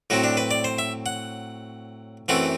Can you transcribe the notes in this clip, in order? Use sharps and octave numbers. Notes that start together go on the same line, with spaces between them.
A2 F#3 C4 F#4
D4
B4
D5
C5
E5
F#5
F#2 E3 A3 C4 F#5